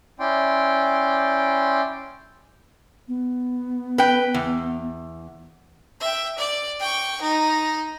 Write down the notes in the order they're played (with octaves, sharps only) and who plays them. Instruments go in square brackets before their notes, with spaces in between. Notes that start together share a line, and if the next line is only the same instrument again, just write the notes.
[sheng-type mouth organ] C#4 E4 D5 G5 C6
[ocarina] B3
[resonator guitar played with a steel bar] B4 G5
E2
[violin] E5 G5
D5
G5 C#6
D#4